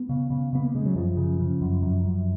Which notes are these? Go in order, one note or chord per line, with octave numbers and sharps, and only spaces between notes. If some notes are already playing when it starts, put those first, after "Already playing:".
Already playing: B3
C#3
C#3
C#3 B3
A#3
C#3 G#3
F#3
F#2 F3
C#3
C#3
F#2
F#2
F#2